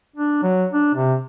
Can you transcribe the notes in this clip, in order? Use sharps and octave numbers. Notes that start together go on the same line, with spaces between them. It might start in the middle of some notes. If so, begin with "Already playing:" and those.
D4
F#3
D4
C3